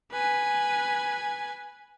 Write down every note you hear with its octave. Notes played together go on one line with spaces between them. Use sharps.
B4 G#5